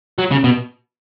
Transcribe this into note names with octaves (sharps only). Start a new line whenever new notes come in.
F#3
C#3
B2